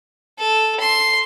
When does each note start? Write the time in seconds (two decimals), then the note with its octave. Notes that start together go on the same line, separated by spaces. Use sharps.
0.39 A4
0.80 C6